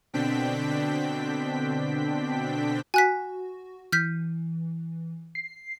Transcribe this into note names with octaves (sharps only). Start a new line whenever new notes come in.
B2 D3 C4 D4 G5 B6
F#4 G#5 F#6 B6
E3 F6 G6 B6
C7